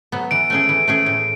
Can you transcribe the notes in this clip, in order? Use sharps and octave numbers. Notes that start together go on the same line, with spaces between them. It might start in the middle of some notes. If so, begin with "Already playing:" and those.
F#3 B3
E3 D7
A3 C#4 G#4
E3
A3 C#4 G#4
A2